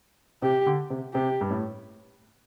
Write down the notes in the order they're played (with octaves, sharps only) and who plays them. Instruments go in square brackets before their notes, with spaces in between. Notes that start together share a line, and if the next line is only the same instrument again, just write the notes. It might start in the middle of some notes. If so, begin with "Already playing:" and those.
[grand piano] C3 [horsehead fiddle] G4
[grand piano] D3
C3
[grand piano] C3 [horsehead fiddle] G4
[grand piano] G2
A2